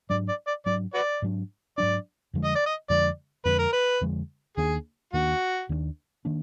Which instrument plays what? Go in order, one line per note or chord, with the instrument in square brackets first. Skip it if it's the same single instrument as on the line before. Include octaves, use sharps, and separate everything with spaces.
[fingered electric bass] G#2 F#3 D4 [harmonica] D5
[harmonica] D5
D5
[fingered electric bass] G#2 F#3 D4 [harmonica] D5
[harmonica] F#4 B4 D5
[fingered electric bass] G#2 F#3 D4
[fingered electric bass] G#2 F#3 D4 [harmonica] D5
[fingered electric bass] F2 D3 F3 G#3
[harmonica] D#5
D5
D#5
[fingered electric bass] F2 D3 F3 G#3 [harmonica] D5
[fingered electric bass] F2 D3 F3 G#3 [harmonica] B4
[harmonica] A#4
B4
[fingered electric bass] F2 D3 F3 G#3
[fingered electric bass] D#2 D#3 A#3 D4 [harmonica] G#4
[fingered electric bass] D#2 D#3 A#3 D4 [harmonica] F#4
[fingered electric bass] D#2 D#3 A#3 D4
D#3 A#3 D4